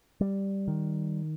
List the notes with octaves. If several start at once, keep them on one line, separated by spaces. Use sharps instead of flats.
G3
D#3